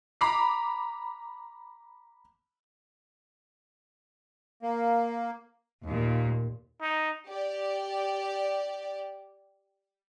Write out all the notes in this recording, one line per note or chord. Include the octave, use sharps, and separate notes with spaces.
A#5 B5 D6 C7
A#3
D#2 A#2
D#4
G4 D5